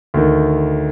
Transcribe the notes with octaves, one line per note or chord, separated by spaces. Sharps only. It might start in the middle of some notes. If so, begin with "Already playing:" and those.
D2 D#3